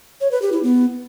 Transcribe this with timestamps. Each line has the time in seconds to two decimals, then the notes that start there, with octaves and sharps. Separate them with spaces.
0.21 C#5
0.31 B4
0.42 G4
0.52 E4
0.63 B3